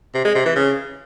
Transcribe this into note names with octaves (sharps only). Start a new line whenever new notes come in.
C3
G#3
C3
E3
C#3